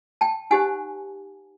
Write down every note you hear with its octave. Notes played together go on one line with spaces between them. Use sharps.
G5 A5
D#4 G4 C5 F#5 G#5